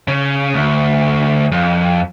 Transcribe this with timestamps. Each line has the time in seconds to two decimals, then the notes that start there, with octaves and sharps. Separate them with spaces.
0.08 C#3
0.54 D2
1.52 F2